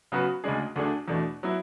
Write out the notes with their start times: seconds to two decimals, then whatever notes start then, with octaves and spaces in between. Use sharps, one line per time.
0.12 C#3 F#3 B3 F#4 B4
0.44 D2 C#3 G#3 D4 G#4
0.76 D2 D3 A3 D4 G#4
1.08 E2 B2 A3 D4
1.43 F#3 B3 E4